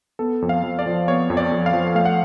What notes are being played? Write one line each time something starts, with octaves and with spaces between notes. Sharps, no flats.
B3 A4
F2
F5
F2
D5
F3
B3 C#5
F2
D5
F2
F5
F3
A3 F5
F#5